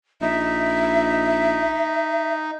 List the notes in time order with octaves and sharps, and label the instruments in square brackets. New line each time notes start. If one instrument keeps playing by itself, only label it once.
[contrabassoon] A#1 [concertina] D#4 [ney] E5